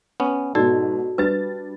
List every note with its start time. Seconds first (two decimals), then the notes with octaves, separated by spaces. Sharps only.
0.20 B3 C#4
0.55 G#2 B2 F#4 A4 D5
1.18 G3 D4 B4 A6